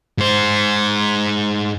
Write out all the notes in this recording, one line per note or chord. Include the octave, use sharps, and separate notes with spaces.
G#2 C5